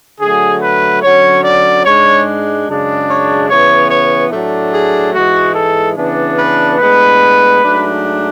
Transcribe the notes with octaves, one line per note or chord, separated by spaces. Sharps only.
D3 F#3 A3 G#4
B4
D3 F#3 C#4 C#5
D5
G#2 G#3 D4 C#5
F#2 C#3 G#3 D4
C#5
C#3 E3 B3 C#5
C#5
A2 F#3 A3 D4
G#4
G#2 E3 G#3 F#4
A4
C#3 E3 B3 D4
B4
A2 G#3 B3 D4 B4
G#2 F#3 A3 D4